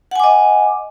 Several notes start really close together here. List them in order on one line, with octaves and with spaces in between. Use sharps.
F#5 G#5 D6 D#5